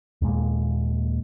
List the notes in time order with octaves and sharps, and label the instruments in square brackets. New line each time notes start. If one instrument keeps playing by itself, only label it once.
[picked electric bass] D#2 A#2 G#3 A#3